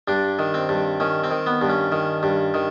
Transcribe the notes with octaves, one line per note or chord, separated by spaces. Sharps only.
G2 D4
D#3
C4
G2
D#3 C#4
C4
D#3
B3
G2
C#4
D#3
G2
D#3